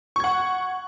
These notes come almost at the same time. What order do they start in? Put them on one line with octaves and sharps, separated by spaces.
C#6 G#6 F#5